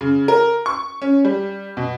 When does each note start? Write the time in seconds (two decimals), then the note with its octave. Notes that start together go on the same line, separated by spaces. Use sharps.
0.01 C#3
0.28 A#4
0.66 C#6
1.02 C#4
1.25 G3
1.77 B2